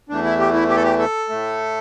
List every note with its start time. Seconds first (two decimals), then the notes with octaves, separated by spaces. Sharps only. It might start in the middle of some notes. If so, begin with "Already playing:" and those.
0.09 E2 E3 A3 D4
0.24 E4
0.39 G4
0.54 E4
0.69 G4
0.76 A4
0.84 G4
0.99 A4
1.29 A2 A3